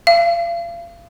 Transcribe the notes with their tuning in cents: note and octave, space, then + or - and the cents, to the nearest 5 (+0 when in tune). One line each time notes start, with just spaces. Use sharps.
F5 -35